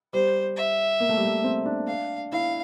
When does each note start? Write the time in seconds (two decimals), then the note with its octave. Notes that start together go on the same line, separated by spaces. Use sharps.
0.13 G3 C5
0.56 E5
1.00 A#3
1.09 A3
1.17 G3
1.25 A3
1.44 C4
1.65 D4
1.88 F5
2.32 E4 F5